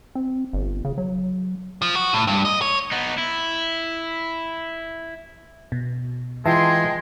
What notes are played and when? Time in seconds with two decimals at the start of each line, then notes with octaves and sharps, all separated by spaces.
0.15 C4
0.53 G1
0.85 C#3
0.98 F#3
1.82 F3
1.96 F#4
2.14 A2
2.27 G2
2.45 D#5
2.61 C#5
2.92 B3 D#4
3.18 E4
5.72 B2
6.45 E3 G#3 F4 E5 G5 A5 C6